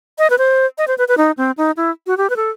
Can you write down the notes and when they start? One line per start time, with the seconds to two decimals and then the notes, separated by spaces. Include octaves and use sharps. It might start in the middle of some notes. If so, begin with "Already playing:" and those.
0.19 D#5
0.30 B4
0.38 C5
0.78 D#5
0.88 C5
0.98 B4
1.08 B4
1.18 D#4
1.38 C4
1.57 D#4
1.77 E4
2.07 F#4
2.18 G4
2.30 B4
2.36 A4